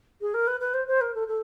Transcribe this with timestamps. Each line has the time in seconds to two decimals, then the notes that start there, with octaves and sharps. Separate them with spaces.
0.21 G#4
0.33 A#4
0.47 B4
0.60 B4
0.73 C5
0.87 C5
1.01 A#4
1.14 A4
1.27 A4